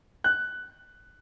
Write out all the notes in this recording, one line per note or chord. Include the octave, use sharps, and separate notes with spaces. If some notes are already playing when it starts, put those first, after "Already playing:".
F#6